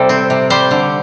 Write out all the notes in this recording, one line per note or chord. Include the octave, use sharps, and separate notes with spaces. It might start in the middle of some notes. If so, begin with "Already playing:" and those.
Already playing: C3 G3 A4
C4
C3
G3 C5
D3